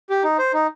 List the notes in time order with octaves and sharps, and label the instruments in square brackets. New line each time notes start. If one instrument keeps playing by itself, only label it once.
[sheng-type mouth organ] G4
D#4
C5
D#4